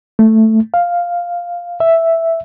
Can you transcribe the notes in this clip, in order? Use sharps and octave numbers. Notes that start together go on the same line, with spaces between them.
A3
F5
E5